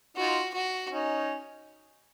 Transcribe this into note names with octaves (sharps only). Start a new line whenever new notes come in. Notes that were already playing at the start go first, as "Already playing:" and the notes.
D#4 F4 F#4
F#4
C#4 D#4